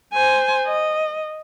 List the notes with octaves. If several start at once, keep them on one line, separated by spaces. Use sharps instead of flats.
C5 G#5
D#5